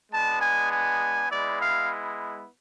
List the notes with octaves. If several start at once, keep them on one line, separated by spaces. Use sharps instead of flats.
G#3 B3 D4 A5
G#5
G#5
G#3 B3 E4 D5
F5